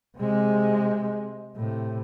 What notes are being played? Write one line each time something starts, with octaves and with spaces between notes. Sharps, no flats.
C3 G#3
A2 C3